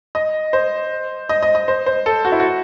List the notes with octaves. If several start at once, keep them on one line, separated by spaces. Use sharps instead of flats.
D#5
C5
D#5
D#5
D#5
C5
C5
A4
F#4
E4
F#4